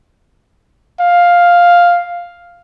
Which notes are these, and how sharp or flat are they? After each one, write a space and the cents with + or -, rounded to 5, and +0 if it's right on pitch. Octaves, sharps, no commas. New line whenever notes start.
F5 +5